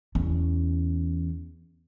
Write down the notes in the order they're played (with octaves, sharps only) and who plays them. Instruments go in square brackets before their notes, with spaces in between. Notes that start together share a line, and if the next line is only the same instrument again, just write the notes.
[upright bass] E2 C#4